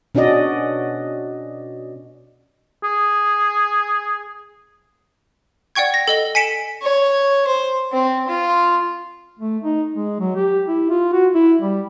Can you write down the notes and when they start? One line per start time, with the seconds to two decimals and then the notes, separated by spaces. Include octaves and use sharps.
0.15 B2 C#4 D4 F#4 D5 D#5
2.84 G#4
5.75 D5 F#5 G5 C#6 G#6
5.94 A#6
6.08 A4 D#5 G7
6.35 G#5 B6 C#7 D7 E7
6.82 C#5
7.47 C5
7.93 C4
8.28 F4
9.39 A3
9.64 D#4
9.94 G#3
10.20 F#3
10.36 G4
10.68 E4
10.90 F4
11.13 F#4
11.35 E4
11.61 G3